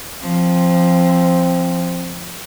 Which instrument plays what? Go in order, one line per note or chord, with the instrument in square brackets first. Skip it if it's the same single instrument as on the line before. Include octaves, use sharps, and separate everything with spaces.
[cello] F3 [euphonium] C4